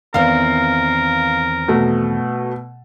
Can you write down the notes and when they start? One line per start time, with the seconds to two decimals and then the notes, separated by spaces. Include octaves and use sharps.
0.14 E2 D#3 C4 A#4 F5
1.68 B2 A3